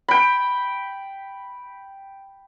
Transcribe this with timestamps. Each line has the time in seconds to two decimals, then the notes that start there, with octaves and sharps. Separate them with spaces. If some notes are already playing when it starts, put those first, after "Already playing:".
0.08 G5 B5